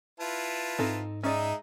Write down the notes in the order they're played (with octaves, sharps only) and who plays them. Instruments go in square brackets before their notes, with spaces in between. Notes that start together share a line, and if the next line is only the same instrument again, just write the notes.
[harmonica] E4 F4 B4 [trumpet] A5
[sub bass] G#2 [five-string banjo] C4 D#4 A4
[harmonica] G#3 G#4 E5 [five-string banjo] C#4 D5 [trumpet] D#4